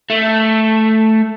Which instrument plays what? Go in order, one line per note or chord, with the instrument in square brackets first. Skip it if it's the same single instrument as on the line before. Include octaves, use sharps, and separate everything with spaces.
[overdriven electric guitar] A3